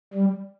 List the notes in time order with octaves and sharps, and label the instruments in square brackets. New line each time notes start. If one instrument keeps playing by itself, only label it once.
[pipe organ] G3